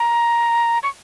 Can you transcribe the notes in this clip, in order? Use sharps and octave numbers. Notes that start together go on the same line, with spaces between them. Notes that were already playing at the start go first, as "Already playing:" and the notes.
Already playing: A#5
C#6